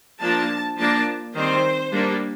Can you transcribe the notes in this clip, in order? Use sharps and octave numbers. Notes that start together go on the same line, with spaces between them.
F3 A#3 D4 A5
F3 A#3 D4 A5
D#3 G3 C4 C5
G3 A#3 D4